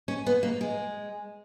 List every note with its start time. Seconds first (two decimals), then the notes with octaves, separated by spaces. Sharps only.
0.08 C#4
0.26 B3
0.43 A#3
0.61 G#3